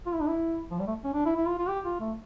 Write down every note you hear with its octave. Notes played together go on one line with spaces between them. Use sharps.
F4
E4
D4
E4
F3
G3
A3
C#4
D4
E4
E4
F4
F4
G4
F4
A3